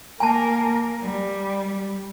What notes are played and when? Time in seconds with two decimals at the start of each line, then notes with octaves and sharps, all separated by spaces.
0.20 A#3 A#4 G#5 A5
1.02 G3